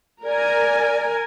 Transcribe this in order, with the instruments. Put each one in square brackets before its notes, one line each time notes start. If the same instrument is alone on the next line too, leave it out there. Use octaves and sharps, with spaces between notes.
[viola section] A#4 G#5 [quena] D5